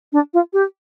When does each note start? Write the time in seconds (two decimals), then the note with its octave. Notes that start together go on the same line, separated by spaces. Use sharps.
0.13 D4
0.34 F4
0.53 G4